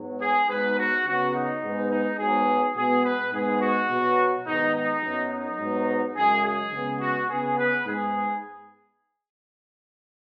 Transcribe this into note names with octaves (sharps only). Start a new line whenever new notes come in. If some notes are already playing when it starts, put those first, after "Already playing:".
Already playing: G#2 F#3 B3
G#4
G#2 F#3 B3 B4
F#4
C#3 F#3 B3 F#4
D#4
G#2 G#3 B3
D#4
G#2 F#3 B3 G#4
B2 G#3 B3 G#4
B4
G#2 G#3 B3 G#4
F#4
B2 F#3 B3
G#2 D#3 B3 D#4
D#4
F#2 F#3 B3
D#4
G#2 F#3 B3
F#2 C#3 G#3 G#4
G#4
C#3 G#3 B3
F#4
C#3 B3 G#4
B4
G#2 G#3 B3 G#4